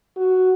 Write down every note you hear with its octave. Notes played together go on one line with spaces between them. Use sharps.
F#4